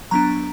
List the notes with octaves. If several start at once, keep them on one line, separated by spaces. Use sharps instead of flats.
F#3 B3 D4 A#5